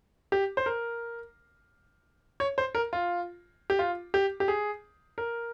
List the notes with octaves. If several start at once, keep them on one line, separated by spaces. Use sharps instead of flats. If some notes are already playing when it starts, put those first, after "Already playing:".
G4
C5
A#4
C#5
C5
A#4
F4
G4
F4
G4
G4
G#4
A#4